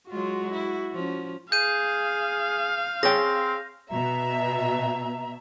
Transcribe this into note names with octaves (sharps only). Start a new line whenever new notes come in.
F#3 G#3 F4 F#4
E4
F3 C#4
G#4 F5 G6 D#7
C4 G#4 C#5 G5 A#6
B2 E5 A#5